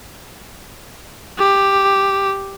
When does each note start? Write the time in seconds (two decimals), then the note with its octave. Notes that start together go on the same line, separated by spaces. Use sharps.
1.38 G4